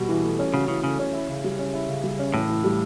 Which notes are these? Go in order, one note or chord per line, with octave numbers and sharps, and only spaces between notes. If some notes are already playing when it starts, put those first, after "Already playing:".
Already playing: B2 G3 F#4
E3
A3
C#4
C#3 F#4
C#3 E3
C#3 A3
C#4
E4
C#3
G3
C#4
E4
C#3
G3
C#4
A2 E3
E3
G3